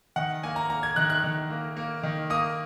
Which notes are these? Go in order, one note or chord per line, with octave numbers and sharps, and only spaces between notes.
D#3 F#5
A#3 G#5
A#5
A#3 A#5
G#6
D#3 F#6
F#6
D#3
A#3
A#3
D#3
A#3 D#6